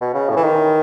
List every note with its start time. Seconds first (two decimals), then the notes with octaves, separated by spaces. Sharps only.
0.01 B2
0.14 C#3
0.29 A2
0.36 E3
0.43 D#3